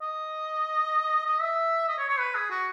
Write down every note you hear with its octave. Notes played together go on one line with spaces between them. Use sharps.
D#5
D#5
E5
D#5
C#5
C#5
B4
G#4
F#4